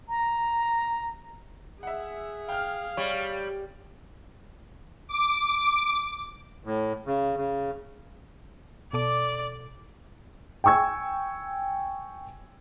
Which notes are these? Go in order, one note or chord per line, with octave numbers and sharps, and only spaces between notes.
A#5
G#4 E5 F#5
F5 G5 F6
G3 C#5
D6
A2
C#3
C#3
B2 A4 D5 D6
G5 G#5 C#6 E6 G#6